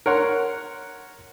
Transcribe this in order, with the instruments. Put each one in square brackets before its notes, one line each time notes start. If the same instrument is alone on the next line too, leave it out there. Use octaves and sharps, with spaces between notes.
[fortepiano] A#4 C#5 F#5 C6